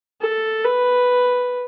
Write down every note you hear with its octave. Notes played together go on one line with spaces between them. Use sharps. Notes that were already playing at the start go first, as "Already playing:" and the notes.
A4
B4